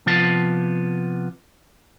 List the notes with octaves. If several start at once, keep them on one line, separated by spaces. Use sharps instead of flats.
C3 F3 B3 F4 A5